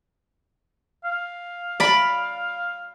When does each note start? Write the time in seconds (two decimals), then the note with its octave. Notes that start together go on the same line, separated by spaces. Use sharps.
1.05 F5
1.80 D5 B5